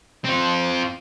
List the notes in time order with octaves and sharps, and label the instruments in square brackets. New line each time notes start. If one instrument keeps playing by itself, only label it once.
[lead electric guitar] C4 F4